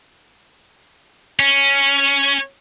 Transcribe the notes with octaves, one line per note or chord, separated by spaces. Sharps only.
C#4